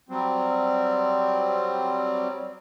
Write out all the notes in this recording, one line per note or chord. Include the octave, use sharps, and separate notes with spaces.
F#3 G3 C4